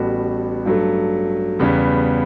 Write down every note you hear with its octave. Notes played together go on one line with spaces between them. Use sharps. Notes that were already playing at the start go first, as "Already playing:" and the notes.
Already playing: A1 A2 G3 B3 F#4
G2 F#3 A3
E2 C#3 G3 B3